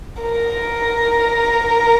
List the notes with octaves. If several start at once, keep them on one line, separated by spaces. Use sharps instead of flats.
A#4